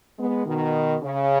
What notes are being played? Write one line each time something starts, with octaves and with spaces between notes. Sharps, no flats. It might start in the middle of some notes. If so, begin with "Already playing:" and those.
G#3 B3
B2 D#3
C#3